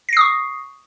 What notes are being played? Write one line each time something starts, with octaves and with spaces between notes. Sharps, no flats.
C#6 D#6 A#6 C7